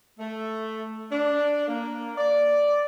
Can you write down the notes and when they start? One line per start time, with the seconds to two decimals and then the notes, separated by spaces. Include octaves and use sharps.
0.19 A3
1.12 D4
1.68 A#3
2.18 D5